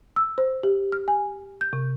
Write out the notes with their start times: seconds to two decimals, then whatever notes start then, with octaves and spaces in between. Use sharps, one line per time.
0.16 E6
0.38 C5
0.63 G4
0.92 F6
1.08 G#5
1.61 G6
1.73 C3